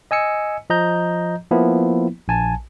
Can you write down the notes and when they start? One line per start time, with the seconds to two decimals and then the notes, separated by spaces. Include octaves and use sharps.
0.11 D#5 G#5 E6 C#7
0.70 F3 D#5 A#5 G6
1.51 F3 A#3 B3 E4
2.28 A#1 G#5 A5